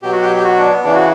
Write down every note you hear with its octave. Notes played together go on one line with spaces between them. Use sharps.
B2 F#3 G4
F#4
G4
G4
F#4
D4
B3
C#3 E3 D4
F#4